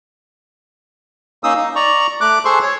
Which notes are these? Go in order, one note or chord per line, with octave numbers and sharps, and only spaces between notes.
A#3 C#4 D#4 D#6 E6
D#4
D5 A#5 C#6
A3 D6 F#6
G#4 A4 C5 C6 C#6
C#5